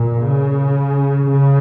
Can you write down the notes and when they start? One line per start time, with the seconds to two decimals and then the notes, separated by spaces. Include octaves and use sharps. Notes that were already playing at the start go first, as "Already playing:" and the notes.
Already playing: A#2
0.25 C#3
1.30 C#3